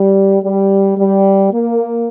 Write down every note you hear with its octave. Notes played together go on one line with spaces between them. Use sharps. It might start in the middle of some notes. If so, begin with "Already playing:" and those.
Already playing: G3
G3
G3
A#3